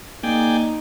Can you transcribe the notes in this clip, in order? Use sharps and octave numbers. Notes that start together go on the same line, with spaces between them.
A#3 D#4 G#4 D5 G5